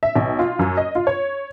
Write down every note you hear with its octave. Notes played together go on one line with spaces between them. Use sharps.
E5
B1
F4
F#2
D#5
F4
C#5